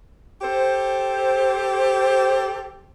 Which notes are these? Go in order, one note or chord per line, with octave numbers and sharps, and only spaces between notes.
G4 A4 C5